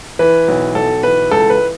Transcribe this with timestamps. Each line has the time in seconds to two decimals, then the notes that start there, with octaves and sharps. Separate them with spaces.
0.19 E3 B4
0.48 B1
0.75 B1 A4
1.03 E3 B4
1.31 C#2 A4
1.50 B4